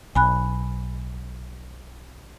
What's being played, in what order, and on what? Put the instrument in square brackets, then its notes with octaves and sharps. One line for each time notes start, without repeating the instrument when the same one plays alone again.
[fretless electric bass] B1 [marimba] G#5 B5 F#6